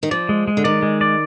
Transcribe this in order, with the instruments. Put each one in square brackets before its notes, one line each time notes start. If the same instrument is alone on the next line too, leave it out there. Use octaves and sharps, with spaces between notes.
[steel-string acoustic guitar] D#3
[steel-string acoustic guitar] F3 [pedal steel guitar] D5
[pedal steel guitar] G#3
G#3
[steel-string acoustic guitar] D3
[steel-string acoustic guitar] D#3 [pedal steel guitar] D5
[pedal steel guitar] G#3
D5